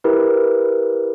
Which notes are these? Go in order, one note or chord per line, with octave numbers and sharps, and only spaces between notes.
E4 G4 A#4 B4